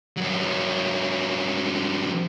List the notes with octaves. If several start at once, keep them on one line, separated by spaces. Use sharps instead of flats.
G2 F#3